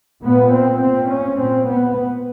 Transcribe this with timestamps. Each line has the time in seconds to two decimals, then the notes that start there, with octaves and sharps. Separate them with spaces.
0.24 A#2 B3
0.53 C4
0.81 A#2 C4
1.10 C#4
1.38 A#2 C4
1.66 B3